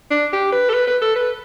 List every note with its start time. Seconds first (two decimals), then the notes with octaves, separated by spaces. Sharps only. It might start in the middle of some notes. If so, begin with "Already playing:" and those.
0.11 D4
0.33 G4
0.52 B4
0.69 A4
0.73 B4
0.87 B4
1.01 A4
1.15 B4